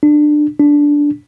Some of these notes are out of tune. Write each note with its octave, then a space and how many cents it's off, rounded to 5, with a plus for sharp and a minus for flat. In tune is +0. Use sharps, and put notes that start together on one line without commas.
D4 +20
D4 -10